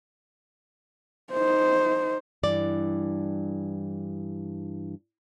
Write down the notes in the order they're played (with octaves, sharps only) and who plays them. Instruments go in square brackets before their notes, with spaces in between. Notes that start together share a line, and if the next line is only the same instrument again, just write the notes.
[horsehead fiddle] D#4 C5
[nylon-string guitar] G2 E3 D5